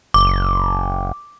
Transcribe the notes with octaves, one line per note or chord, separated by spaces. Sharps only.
F#1 D6